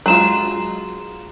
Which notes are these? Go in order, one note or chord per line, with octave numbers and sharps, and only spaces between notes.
F#3 G#3 F4 A#5 E7